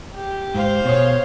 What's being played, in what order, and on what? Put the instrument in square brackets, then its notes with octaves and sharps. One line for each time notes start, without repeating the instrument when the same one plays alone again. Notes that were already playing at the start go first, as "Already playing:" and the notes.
[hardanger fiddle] G4
[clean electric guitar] G#2 [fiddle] C5 F5
[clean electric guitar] B2 F#4 G#4 [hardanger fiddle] C#5